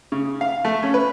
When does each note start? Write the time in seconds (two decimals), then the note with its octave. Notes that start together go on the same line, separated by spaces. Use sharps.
0.12 C#3
0.41 F5
0.65 A3
0.83 C#4
0.94 B4